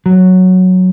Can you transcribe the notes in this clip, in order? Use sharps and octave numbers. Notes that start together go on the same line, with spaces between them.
F#3